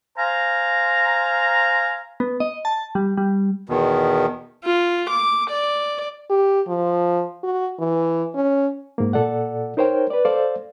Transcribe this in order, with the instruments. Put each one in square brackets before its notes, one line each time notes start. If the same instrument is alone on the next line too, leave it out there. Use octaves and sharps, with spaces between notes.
[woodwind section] C5 F5 G#5 A#5
[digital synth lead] B3
D#5
A5
G3
G3
[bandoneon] E2 B2 D#3
[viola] F4
D6
D5
[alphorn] G4
F3
F#4
E3
C#4
[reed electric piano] G#2 A#3
A#2 A4 D5 F#5
D#4 A#4 C5 C#5 G5
B4 D5
A4 C5 D5 F5